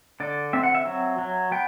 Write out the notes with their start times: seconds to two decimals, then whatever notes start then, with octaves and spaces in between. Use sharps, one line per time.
0.20 D3 D5
0.53 C4 E5
0.63 F#5
0.75 E5
0.86 F#3
1.19 F#3
1.52 B3 G5